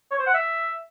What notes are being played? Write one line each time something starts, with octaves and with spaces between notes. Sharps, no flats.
C#5
C5
F#5
E5